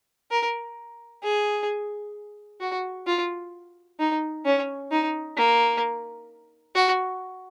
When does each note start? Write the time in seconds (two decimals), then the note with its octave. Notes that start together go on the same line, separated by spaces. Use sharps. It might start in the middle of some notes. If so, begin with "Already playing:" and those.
0.31 A#4
1.24 G#4
2.61 F#4
3.07 F4
4.00 D#4
4.45 C#4
4.91 D#4
5.37 A#3
6.75 F#4